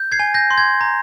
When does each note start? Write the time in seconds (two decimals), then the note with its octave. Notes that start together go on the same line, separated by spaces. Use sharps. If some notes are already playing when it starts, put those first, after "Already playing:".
Already playing: G6
0.12 G#6 C7
0.19 G#5
0.34 G6 A#6
0.51 C6
0.58 G#6
0.81 A#5